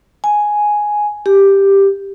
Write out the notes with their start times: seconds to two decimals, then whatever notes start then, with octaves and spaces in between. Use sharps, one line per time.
0.24 G#5
1.26 G4